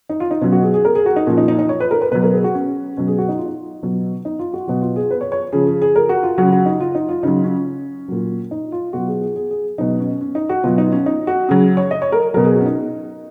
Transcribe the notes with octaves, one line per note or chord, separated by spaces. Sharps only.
D#4
F4
D#4
B2 F#3 C#4
F#4
G#4
G#4
A#4
G#4
F#4
D#4
A#2 F3 C#4
D#4
D#4
D#4
C#5
B4
A#4
B4
B2 F#3 B4
A#4
G#4
F#4
C#4
B2 F#3 C#4
G#4
F#4
D#4
F4
D#4
B2 F#3
D#4
F4
F#4
B2 F#3 F#4
F4
G#4
B4
C#5
C#5
C#3 F3 G#4
G#4
G#4
A#4
F#4
F4
C#3 F#3 F#4
F#4
D#4
F4
D#4
F4
C#3 F#3 D#4
C#4
A#2 F#3
D#4
F4
B2 F#3 F#4
G#4
G#4
G#4
G#4
B2 F#3 D#4
C#4
C#4
D#4
F#4
B2 F#3 F4
D#4
C#4
D#4
F#4
C#3 F#3 G#4
C#5
D#5
C#5
A#4
B2 F#3 A#4
G#4
F#4
C#4
D#4